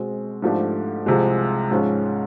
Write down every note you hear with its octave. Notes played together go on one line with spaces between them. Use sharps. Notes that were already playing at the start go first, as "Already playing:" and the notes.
Already playing: B2 G#3 C4
G#2 F3 A3 D4 G4
C2 C3 F3 G#3
G#2 F3 G#3 C#4